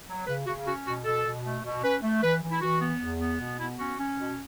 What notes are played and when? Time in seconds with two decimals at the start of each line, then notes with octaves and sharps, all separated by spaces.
0.08 F#3
0.27 C#3 B4
0.47 C#3 F#4
0.66 C#4 F#4
0.86 B2 F#4
1.05 B2 A4
1.25 B2
1.44 A3
1.64 B2
1.83 C#4 B4
2.02 A3
2.22 E3 B4
2.42 E3
2.51 E4
2.61 E3 F#4
2.81 B3
3.01 E2
3.20 B3
3.40 B2
3.59 B3 E4
3.79 C#4 F#4
3.99 C#4
4.17 B2